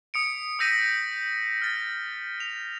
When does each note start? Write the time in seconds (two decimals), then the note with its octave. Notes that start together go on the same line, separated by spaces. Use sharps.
0.14 D#6 C#7 D7
0.59 D#6 E6 G6 A#6 B6 D#7
1.62 F6 A6
2.40 F7